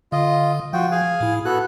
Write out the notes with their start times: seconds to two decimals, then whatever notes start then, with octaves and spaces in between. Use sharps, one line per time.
0.12 D3 F4 D#5
0.73 F3 F4 F#4 G5
0.91 G#4 F5 G#5
1.20 A2 E4
1.45 B3 F#4 A4 F#6